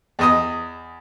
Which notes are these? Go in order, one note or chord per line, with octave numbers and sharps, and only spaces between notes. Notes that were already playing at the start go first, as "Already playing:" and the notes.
E2 D#5 D#6